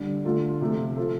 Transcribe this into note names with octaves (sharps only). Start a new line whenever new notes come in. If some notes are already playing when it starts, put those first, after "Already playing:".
Already playing: D3 G3 D4
D3 A3 F4 A4
C3 F3 A3 F4 A4
F3 C4 F4 A4